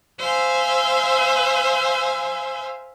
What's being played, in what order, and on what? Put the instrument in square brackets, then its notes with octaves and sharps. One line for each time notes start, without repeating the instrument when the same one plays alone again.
[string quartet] C5 E5 F5 G#5